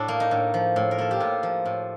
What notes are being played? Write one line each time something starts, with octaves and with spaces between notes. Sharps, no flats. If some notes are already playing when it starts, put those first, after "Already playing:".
Already playing: A2 D4
A#3
D#4
A2
F3
A2
A#4
A#3 A4
G4
A2 F4
F3
A2